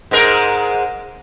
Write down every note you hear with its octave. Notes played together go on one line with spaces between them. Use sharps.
G#2 G#3 A#4